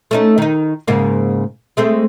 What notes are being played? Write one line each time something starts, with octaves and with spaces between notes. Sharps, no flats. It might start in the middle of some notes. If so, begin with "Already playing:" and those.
A3 C#4 D#4
D#3 D#4
G#2 C#3 A#3
G#3 A3 C4